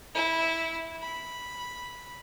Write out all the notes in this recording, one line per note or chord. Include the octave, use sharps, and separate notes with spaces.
E4
B5